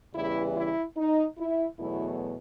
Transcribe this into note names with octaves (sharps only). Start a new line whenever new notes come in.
E2 C#3 E3 G3 E4
E4
D#4
E4
E2 B2 F#3 A3 E4